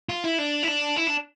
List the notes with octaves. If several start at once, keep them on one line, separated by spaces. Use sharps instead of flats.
F4
E4
D4
E4
D4
E4
D4